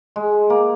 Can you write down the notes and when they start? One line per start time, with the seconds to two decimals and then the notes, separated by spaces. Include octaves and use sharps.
0.16 G#3
0.50 A#3